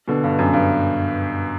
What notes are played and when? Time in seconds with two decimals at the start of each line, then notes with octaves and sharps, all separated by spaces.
0.08 B2 D3
0.24 G2
0.39 F#2
0.54 G2